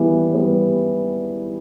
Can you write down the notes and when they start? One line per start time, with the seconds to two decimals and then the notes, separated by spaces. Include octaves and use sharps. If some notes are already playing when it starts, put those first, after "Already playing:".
Already playing: E3 G3 B3
0.34 G3 B3